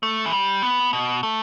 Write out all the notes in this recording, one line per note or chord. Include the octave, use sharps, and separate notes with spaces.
A3
E3
G3
B3
B2
A3